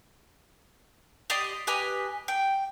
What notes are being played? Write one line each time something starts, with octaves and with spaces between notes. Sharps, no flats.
G4 D5 D#5 C6
G4 B4 D#5 G#5
G5